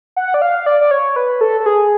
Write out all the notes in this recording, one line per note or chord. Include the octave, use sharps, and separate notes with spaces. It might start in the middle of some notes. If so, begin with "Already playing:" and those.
F#5
D5
F5
D5
D5
C#5
B4
A4
A4
G#4